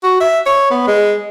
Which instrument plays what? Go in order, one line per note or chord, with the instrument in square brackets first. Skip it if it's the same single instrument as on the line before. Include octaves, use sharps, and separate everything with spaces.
[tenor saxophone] F#4
E5
C#5
B3
G#3